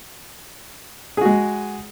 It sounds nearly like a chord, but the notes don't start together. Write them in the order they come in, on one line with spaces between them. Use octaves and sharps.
G#4 F#4 G#3